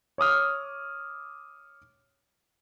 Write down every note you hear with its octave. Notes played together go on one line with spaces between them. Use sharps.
C#5 D6 D#6 F6